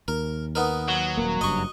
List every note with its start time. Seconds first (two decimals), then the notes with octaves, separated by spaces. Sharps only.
0.08 D#2 A#4
0.55 B3 D#4 A#4
0.88 F#3
1.17 D#1 A#3
1.41 F#1 G2 D#5 C#6